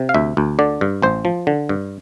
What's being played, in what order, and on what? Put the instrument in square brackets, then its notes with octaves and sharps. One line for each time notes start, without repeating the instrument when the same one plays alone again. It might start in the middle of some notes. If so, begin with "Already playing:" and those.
Already playing: [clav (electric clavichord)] C3
F5
D2 E5
D2
D3 D5
G2
A1 C5
F3
D3
G2